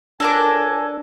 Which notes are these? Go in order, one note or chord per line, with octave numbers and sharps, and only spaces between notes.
C#2 D3 D4 A4 A#4 G#5 D6